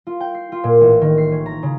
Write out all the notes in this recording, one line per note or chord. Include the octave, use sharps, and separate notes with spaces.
F4
G5
C7
F4
A#2
A1
D#3
C7
C#4
A#5
C#3